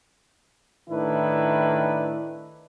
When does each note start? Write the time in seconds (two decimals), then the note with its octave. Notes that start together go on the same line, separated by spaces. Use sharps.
0.90 A2 D#3 D4 E4 B4